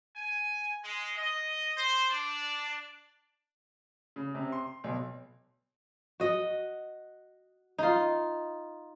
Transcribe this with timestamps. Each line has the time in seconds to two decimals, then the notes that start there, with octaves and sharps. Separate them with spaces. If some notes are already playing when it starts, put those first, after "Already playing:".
0.16 G#5
0.83 G#3
1.16 D#5
1.75 C5
2.09 D4
4.16 C#3
4.35 C3
4.52 C6
4.84 B1
6.20 F#4 D#5
7.78 D#4 F4